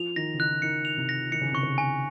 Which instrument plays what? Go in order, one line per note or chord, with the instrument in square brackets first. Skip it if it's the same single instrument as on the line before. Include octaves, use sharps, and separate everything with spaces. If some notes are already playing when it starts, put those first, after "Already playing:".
Already playing: [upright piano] F3 [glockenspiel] F7
[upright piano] D#3 [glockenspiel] A#6
[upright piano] C#3
[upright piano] D#3 [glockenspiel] F#6
[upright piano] D#3 [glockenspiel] C#7
[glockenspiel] F7
[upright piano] C3
[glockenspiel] A#6
[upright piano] D#3 [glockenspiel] C#7
[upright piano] C#3
[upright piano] C3 [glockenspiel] C#6
[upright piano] C#3
[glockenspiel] G#5